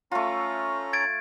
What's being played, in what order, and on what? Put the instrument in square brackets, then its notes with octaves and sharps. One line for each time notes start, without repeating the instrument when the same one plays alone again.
[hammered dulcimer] A3 F4 [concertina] C#4 A#5
[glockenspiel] G#6 A6 D7